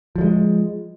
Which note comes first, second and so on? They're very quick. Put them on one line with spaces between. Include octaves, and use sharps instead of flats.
F3 F#3 G#3